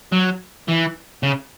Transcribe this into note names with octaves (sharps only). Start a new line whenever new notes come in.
F#3
E3
C#3